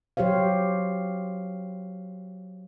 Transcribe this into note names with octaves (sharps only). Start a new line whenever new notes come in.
F#3 G4 C5 C#5 F5